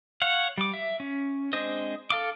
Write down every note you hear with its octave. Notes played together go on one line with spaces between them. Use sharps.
C#5 F5 F#5
G3 D6
E5
C#4
G#3 C4 D4 C5 D#5
A4 F5 D6